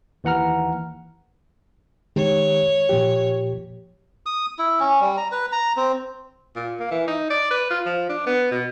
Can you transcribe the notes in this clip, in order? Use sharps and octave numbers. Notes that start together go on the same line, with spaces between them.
D#2 E3 F#5 A#5 F6
D#3 G#3 G4 C#5
A#2 F3 G4
D#6
E4
C#4
G3
A#5
B4
A#5
C4
A#2
A#3
E3
D#4
D5
B4
F4
F3
D4
B3
B2